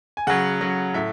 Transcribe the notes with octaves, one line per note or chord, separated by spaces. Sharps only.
G#5
C#3 F#3 F#5
C#3 F#3
A2 E5